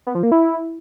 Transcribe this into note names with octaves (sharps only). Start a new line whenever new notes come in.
B3
F3
A#3
E4